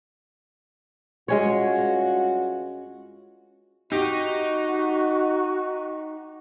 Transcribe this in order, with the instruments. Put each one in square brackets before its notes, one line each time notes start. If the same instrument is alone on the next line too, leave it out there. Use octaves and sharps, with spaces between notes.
[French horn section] G2 F4 F#4 [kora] G#3 C#4 C#5
[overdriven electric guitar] D#4 [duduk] F#4 [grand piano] G4